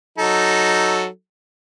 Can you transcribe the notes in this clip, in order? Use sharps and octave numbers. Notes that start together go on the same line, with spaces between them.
F#3 D#4 A4